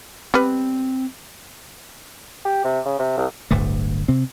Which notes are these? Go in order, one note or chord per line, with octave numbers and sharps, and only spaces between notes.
G3 B3 C4 B4
G4
C3
C#3
C3
C2
D1 G1 D2 A3
C3 C4